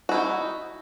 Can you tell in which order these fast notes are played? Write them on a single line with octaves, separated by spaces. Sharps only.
F#4 E4 D#4